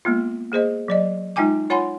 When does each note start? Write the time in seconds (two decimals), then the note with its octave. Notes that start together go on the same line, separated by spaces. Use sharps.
0.05 G#3 A#3 B3 F4
0.52 A#3 G#4 C5 D#5
0.88 F#3 D5 D#5
1.36 G#3 D#4 F4 G5 G#5 D6
1.70 F4 C#5 F#5 G#5 B5 C6